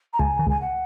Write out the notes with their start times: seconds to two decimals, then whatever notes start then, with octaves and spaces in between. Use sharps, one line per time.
0.13 A#5
0.19 C#2 C#3 G#5
0.39 D#3
0.46 C#2 C#3 G#5
0.61 F#5